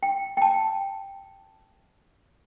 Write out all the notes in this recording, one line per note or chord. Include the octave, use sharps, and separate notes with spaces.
G5
G5 A5